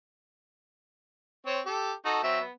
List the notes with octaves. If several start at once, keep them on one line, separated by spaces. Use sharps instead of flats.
C4 C#5
G4 A4
D#4 F#4 A4
F#3 C4 E5
B3